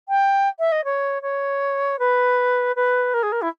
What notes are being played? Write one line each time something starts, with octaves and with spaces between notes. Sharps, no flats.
G5
E5
D#5
C#5
C#5
B4
B4
A#4
G#4
A#4
E4